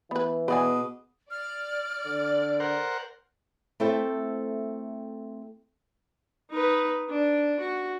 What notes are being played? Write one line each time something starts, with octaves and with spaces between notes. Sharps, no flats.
E3 B3 B4
B2 G#4 B4 D5 F#5 G#5 D#6
D5 F6
D3
A#4 C5 F#5
A3 C4 E4 A4 C5 E5
D#4 B4
D4
F#4